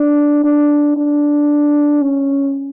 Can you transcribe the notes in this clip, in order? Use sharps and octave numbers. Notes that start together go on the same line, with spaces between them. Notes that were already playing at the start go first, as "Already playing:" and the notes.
Already playing: D4
D4
D4
C#4